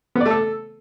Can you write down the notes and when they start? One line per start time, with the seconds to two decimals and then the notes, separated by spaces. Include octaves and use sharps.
0.15 B3
0.20 D5
0.26 A3
0.31 A4